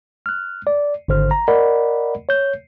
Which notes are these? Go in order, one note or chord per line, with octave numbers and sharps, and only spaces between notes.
F6 F#6
D5
G#1 D3 C5 F6
A#5
A#4 D5 D#5 F#5 B5
C#5 G6